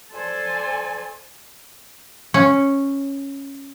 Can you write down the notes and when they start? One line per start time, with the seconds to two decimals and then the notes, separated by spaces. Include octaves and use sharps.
0.13 A4 C5 D5 G#5
2.34 C#4